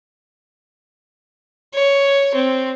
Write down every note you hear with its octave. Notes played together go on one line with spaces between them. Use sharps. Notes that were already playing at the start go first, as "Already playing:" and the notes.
C#5
C4